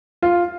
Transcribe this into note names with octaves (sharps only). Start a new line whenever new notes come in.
F4